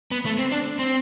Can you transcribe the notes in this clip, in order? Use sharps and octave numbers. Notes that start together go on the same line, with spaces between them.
B3
A3
C4
D4
C4